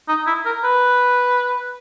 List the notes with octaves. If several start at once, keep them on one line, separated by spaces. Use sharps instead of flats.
D#4
E4
A#4
B4